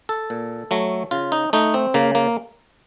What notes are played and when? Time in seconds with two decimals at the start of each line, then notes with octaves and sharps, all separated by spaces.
0.09 A4
0.30 A#2
0.71 F#3 A3
1.11 C#3 F4
1.32 D#4
1.53 A3 D#4
1.74 C4
1.94 C#3 A#3
2.15 A#3